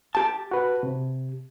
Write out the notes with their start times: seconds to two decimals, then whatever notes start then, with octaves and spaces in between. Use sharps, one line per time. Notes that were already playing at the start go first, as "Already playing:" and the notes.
0.15 G4 A5
0.51 F#4 B4
0.83 C3